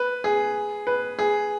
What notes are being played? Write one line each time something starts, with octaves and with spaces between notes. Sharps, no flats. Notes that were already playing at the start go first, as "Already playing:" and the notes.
Already playing: B4
G#4
B4
G#4